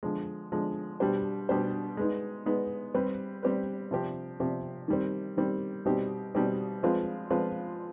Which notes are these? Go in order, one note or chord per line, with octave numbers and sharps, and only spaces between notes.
D3 F3 G#3
D3 F3 G#3
B2 G3 D4 G4 C5
B2 G3 D4 G4 C5
G#3 B3 D#4
G#3 B3 D#4
G3 C4 G4 B4
G3 C4 G4 B4
C3 F3 C4 G4
C3 F3 C4 G4
D#3 G3 C4
D#3 G3 C4
B2 G3 C4 D#4 G4
B2 G3 C4 D#4 G4
F3 G#3 C4 F4 B4
F3 G#3 C4 F4 B4